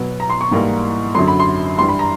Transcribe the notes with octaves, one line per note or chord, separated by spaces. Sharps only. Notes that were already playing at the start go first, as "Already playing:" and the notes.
Already playing: B2 F#3 B3
A#5
C6
C#6
G#2 E3 G3 A#3
F#2 D3 F#3 C6
B5
C6
G2 E3 G3 C6
B5
A#5